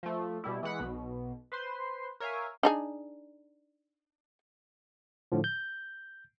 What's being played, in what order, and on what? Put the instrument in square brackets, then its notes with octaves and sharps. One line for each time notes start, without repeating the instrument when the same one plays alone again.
[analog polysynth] F3 A3
B2 G3 E4
E3 G#3 F#5 B6
B1 B2
B4 C5 C6
A#4 C#5 E5 F5 G#5
[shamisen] D4 D#4 G#4
[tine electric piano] A2 D3 F3
G6